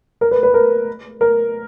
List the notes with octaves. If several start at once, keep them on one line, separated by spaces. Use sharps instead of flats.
A#4
B4
B4
A#4
A#4